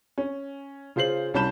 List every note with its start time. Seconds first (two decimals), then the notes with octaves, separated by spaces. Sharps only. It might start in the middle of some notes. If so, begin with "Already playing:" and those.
0.18 C#4
0.96 C#3 F4 C5 C7 F#7
1.34 C2 C#4 A5 B5 G6 E7